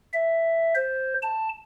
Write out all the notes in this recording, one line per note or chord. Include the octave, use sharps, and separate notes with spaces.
E5
C5
A5